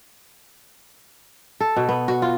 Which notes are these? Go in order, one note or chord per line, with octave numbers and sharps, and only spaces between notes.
A4
B2
B3
F#4
F4